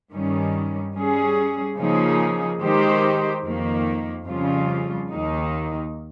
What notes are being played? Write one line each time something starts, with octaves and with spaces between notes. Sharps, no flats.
G2 D#3 G3 C#4
G3 C#4 G#4
C#3 F3 A#3 D#4 G#4
D#3 G#3 D#4 G4 C5
F2 D#3 A#3
F2 C#3 G3 C#4 F4
D#2 D#3 A#3 D#4